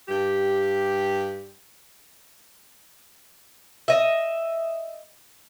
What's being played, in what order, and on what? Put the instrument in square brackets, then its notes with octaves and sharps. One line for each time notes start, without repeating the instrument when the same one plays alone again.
[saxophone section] G2 G4
[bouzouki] D#5 E5